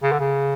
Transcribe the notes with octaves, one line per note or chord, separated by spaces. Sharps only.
C#3
D3
C#3